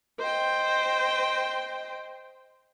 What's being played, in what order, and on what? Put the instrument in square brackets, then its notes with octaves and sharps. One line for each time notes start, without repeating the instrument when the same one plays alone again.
[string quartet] C5 D#5 G5